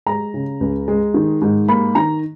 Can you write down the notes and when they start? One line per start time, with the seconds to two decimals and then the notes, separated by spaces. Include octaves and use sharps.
0.06 G#3 A#5
0.34 C#3
0.60 C#2
0.88 G#3
1.14 D#3
1.42 G#2
1.68 A#3 B5
1.95 D#3 A#5